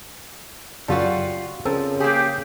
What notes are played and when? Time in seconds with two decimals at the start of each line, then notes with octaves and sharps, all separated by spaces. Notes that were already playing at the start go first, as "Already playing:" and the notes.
0.88 F#2 C#3 G3 F4 F#4 A5
1.65 C#3 F3 C4 A4 A#4
2.00 A#3 G4 G#4